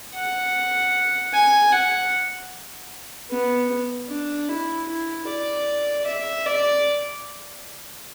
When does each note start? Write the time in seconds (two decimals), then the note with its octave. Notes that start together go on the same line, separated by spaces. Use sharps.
0.14 F#5
1.33 G#5
1.72 F#5
3.30 B3
4.09 D4
4.49 E4
4.88 E4
5.27 D5
6.07 E5
6.46 D5